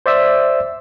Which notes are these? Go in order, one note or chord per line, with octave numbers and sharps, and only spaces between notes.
C5 D5 E5 E6